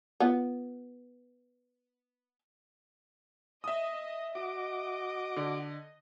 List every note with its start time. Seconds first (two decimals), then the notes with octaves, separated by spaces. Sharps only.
0.20 B3 F4
3.64 D#5 E5 D#6
4.35 F#4 D#5 D6
5.36 D3